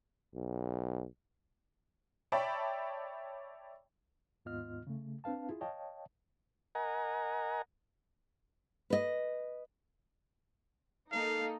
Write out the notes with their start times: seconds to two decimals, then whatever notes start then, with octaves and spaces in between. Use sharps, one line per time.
0.35 B1
2.32 C#5 D5 E5 G5 A5 B5
4.45 D#2 G#2 B3 F4 D#5 F6
4.87 C#3 A3
5.24 C4 D4 B4 F5 A5
5.49 E4 F4 G#4
5.61 C#5 D#5 F5 G5 A5
6.75 A#4 D#5 F#5 G#5 A#5
8.90 B4 D#5
11.12 A#3 D#4 A4 F5